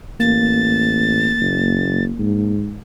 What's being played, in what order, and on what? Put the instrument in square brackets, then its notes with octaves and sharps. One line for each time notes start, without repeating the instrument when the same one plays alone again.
[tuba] A1 [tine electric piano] A#3 [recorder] A6
[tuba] F#1
G#2